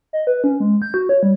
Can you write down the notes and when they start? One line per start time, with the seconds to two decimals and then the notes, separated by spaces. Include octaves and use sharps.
0.13 D#5
0.27 B4
0.44 C#4
0.60 G#3
0.82 G6
0.94 F#4
1.09 C#5
1.23 G3